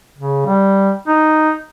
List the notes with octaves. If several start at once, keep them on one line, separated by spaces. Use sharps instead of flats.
C#3
G3
D#4